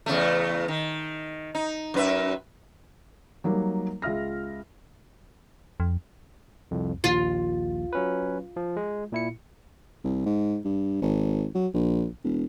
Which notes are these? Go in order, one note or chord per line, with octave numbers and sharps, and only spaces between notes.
E2 C#3 A3
D#3
D#4
F#2 B4 E5
F#3 G3 A#3 D#4
C#2 F4 E5 F6 A#6
F2
C2 F2
A#1 D#2 F4
F#3 C#4 B4
F3
G#3
A#2 E4 C#7
C2
G#2
G2
G#1
F#3
A#1
E1